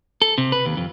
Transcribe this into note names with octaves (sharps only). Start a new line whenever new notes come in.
A4
C3
B4
D#2
F2